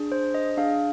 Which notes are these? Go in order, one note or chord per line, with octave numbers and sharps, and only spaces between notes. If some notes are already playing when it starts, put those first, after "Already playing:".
Already playing: D4 G#4
C5
D#5
D4 G#4 F5